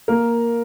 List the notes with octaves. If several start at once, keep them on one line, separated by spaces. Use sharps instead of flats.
A#3 A#4